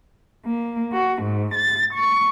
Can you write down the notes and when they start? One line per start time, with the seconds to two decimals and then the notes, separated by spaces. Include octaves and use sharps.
0.45 A#3
0.93 F#4
1.23 G#2
1.55 A6
1.94 C#6